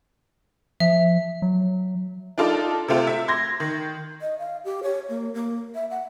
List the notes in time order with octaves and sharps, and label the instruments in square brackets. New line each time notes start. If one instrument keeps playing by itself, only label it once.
[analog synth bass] F3 [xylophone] E5
[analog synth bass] F#3
[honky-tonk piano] D4 D#4 F4 A4 D5
C3 A3 C4 F4
E5
C6 G#6 A#6
D#3
[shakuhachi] D#5
F5
G4
C#5
A#3
A#3
E5
F#5